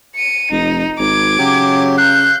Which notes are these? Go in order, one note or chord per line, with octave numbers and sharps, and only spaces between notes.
C#7 D#7
F1 D#4
G#1 D6 G#6
C#3 F#3 G4
F5 F#6 G6